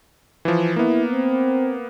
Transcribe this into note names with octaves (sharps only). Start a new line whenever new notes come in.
E3 F3
A#3 B3 E4
C4